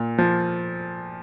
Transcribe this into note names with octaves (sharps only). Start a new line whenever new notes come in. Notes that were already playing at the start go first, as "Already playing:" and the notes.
Already playing: A#2
F3